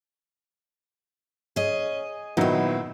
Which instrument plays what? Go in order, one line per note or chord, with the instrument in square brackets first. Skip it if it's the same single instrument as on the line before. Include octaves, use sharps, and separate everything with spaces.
[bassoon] C#4 [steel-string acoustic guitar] G#4 D#5
[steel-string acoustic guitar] A#2 C4 [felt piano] D#3 F#3 D#4 [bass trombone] B3 [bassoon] E4